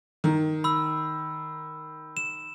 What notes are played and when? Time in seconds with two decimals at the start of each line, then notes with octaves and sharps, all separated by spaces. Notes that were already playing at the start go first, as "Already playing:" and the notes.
0.24 D#3
0.64 B5 E6
2.17 E7